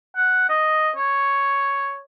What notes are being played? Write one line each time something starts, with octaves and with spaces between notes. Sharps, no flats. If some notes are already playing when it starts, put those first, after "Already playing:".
F#5
D#5
C#5